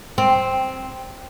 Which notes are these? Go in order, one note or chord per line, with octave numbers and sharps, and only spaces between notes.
C4